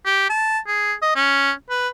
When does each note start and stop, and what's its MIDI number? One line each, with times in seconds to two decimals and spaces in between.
0.06 0.25 67
0.30 0.59 81
0.67 0.93 68
1.02 1.12 75
1.16 1.51 61
1.70 1.88 71